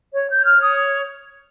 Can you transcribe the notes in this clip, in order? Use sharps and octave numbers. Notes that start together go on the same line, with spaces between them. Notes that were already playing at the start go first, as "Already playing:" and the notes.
C#5
G6
C#5
F6
C#5
D#6